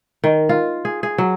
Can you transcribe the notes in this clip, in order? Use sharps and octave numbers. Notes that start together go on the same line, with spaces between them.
D#3
F4
G#4
G#4
F#3